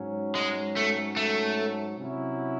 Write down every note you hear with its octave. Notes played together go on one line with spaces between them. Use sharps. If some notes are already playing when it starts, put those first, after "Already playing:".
Already playing: G#2 F#3 C#4
G#3
A3
A3
C3 F#3 C#4 E4